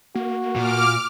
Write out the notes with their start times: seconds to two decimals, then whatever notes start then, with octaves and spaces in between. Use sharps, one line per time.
0.15 A#3 F#4
0.56 A#2 D6 F6